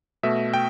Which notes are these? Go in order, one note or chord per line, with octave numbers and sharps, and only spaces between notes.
B2 A3 E5
G5